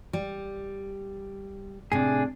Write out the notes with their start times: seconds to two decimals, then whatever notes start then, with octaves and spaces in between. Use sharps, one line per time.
0.13 G3
1.92 A2 C3 D4 G#4